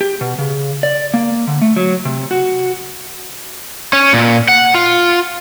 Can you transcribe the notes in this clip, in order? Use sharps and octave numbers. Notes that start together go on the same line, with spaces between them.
G4
B2
C#3
D5
A#3
D3
A3
F#3
C3
F#4
C#4
A#2
F#5
F4